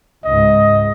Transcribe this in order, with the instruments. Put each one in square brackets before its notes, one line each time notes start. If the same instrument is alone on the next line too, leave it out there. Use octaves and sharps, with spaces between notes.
[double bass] C#2 G#2 [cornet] D#5